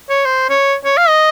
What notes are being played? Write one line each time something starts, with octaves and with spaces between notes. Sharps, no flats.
C#5
C5
C#5
C#5
F5
D#5